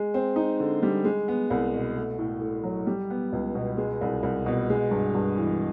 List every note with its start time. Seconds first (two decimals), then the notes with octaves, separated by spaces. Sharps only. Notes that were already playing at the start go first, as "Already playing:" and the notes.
Already playing: G#3
0.14 C4
0.36 D#4
0.60 D3
0.83 G3
1.04 G#3
1.28 B3
1.50 C2
1.74 B2
1.96 A3
2.18 A2
2.41 A2
2.63 F#3
2.87 G3
3.10 B3
3.33 C#2
3.55 B2
3.77 G#3
4.01 C2
4.23 C2
4.46 B2
4.70 G#3
4.91 G2
5.15 G2
5.37 E3